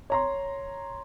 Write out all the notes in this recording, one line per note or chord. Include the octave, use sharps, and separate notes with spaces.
C#5 A#5 C6